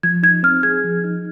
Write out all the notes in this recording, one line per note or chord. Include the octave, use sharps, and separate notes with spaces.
F3 G#6
D#4 G#6
C4 F6
G#4 G#6
F3
D#4